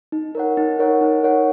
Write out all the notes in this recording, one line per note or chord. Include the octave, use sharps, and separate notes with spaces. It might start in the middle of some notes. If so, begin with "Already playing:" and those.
D#4
A#4 C#5 F#5
D#4
A#4 C#5 F#5
D#4
A#4 C#5 F#5